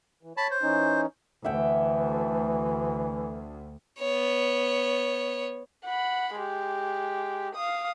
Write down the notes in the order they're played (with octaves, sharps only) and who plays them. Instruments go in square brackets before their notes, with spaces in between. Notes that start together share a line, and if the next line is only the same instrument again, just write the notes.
[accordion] E3
[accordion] C#5 [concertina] A5 B5
[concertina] C5
[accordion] E3 C#4 D#4
[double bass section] D2 [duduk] E3 [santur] E5 F#5 G5
[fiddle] B3 C#5
[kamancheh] F#5 B5
G#3 G4
F5 D#6